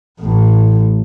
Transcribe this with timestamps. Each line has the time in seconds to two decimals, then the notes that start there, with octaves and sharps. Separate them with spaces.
0.21 A1 A2